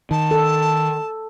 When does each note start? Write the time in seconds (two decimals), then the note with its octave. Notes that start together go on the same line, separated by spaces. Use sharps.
0.11 D#3 A5
0.31 A4